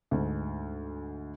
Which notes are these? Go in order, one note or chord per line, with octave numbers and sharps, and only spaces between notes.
D2 G#2